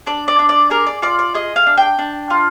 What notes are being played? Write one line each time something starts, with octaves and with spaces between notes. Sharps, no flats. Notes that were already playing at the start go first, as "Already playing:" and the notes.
D4 D5
D5
D4
D5
G#4 A#4
D5
F4 D5
D5
G#4 D#5
F5
D4
G5
D4
F4